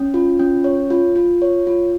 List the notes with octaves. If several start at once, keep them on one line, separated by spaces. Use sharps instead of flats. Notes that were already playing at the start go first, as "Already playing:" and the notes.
Already playing: C#4
F4
C#4
C#5
F4
F4
C#5
F4